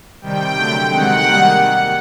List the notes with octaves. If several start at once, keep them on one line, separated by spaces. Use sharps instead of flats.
C3 D#3 G3 G5
D3 F#3 A3
C3 D#3 G#3 F#5
D#3 G3 A#3